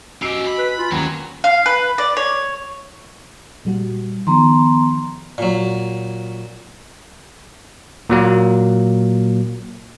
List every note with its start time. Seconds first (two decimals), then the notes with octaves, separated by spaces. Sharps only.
0.22 C#4 F#4 G4 D#5 G#5 E6 C7 D7
0.47 B5
0.58 B4
0.78 F4 G#5
0.92 D#2 F#3 C#4 C#5 A#5 C6
1.44 F5
1.66 B4
1.98 D5
2.17 C#5
3.65 A#2 G3 F#4
4.27 D#3 F3 B3 A#5 C6
5.38 A#2 F#3
8.10 A#2 F#3 A#3